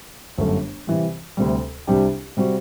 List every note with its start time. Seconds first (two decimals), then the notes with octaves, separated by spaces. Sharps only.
0.38 G1 F#2 D3 A3
0.87 C3 E3 G3
1.37 D2 C3 G3
1.87 C2 C3 G3 D4 G4
2.37 C3 G3 C4 F#4